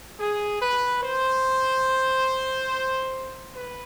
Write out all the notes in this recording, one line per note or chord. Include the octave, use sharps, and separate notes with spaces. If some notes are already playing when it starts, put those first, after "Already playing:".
G#4
B4
C5
B4